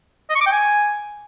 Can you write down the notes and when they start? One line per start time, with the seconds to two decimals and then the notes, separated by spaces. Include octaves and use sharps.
0.30 D#5
0.35 C#6
0.41 D6
0.46 G5
0.52 G#5